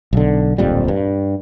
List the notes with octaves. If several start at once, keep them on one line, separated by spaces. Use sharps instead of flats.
B1 D3
D1 A#1 F2 G3
G2